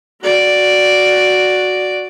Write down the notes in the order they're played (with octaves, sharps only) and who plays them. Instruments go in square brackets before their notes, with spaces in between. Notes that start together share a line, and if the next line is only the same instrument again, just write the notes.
[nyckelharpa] F#4 D5